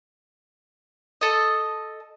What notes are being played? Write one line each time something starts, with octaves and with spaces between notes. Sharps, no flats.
A4 D#5